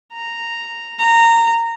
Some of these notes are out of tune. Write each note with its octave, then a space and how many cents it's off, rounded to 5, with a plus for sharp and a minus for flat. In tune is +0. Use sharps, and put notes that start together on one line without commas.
A#5 -5
A#5 -20